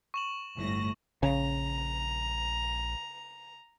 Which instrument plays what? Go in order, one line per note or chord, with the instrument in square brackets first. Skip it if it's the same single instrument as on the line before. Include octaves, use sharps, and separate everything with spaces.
[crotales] C#6 E7 F#7
[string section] G1 A2 A#6
[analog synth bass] A#1 [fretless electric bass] C#3 [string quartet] A#5